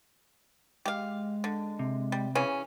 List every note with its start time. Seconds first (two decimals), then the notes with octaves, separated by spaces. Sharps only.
0.85 G#3 G4 F5
1.44 D3
1.79 C3
2.12 G3
2.35 C#3 E3 C#4